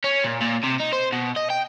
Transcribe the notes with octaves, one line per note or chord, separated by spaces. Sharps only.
C#4
A#2
A#2
C3
D#4
C5
B2
D#5
G5